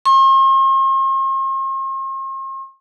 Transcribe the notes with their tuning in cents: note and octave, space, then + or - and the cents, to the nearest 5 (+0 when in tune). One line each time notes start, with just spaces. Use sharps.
C6 +45